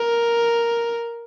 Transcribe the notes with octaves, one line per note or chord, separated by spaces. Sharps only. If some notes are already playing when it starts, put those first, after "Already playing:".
Already playing: A#4